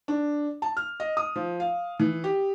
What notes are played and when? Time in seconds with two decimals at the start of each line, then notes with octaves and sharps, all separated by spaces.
0.08 D4
0.62 A5
0.77 F6
1.00 D#5
1.17 D#6
1.36 F3
1.60 F5
2.00 E3
2.24 G4